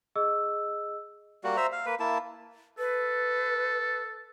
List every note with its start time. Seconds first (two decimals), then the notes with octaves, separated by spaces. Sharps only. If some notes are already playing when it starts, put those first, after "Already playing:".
0.16 G#4 D#5 E6
1.44 G3 A#3 F#4
1.57 C5 E5 A#5
1.72 F5
1.86 A#3 B4
2.00 A#3 E4 A5
2.79 A4 B4